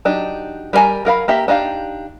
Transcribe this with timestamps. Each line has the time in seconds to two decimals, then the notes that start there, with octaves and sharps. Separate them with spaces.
0.05 F#3 D4 D#4 G4
0.73 G3 A#4 D5 G#5 A#5
1.05 F#3 A#4 F5 B5
1.28 A#3 G4 E5 A#5
1.48 D4 D#4 G4 F5